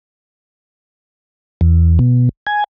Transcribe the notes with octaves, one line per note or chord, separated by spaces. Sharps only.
E2
B2
G#5